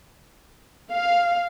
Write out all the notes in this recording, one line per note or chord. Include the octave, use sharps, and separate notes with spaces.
F5